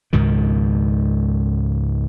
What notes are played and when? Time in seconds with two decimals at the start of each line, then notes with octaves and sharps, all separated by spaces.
0.13 C#2 G#2 B2 D#3